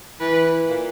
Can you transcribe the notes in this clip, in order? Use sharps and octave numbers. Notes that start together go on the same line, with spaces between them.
E3 B4
A#2